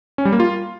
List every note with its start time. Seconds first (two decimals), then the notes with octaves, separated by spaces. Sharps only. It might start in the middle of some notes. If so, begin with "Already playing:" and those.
0.18 C#4
0.25 G3
0.32 A#3
0.40 F4